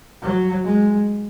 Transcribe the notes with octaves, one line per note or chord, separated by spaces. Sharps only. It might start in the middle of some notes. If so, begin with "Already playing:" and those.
F#3
G#3